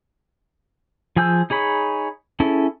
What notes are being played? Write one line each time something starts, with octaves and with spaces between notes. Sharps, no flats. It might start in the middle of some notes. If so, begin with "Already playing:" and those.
F3 G#4 G#5 E6 G6
D#4 G#4 C#5 B5
C#4 E4 G#4 A4